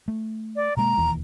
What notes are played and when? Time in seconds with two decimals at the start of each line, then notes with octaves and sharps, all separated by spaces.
0.08 A3
0.56 D5
0.77 B2 G#3 A#3 A#5
0.97 E1 D#2 E3